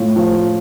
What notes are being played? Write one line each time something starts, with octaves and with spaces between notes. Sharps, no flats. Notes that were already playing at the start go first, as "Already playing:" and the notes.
Already playing: A2 F4
F3